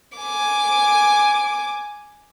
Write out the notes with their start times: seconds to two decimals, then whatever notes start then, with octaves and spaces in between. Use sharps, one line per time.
0.18 G#5 D6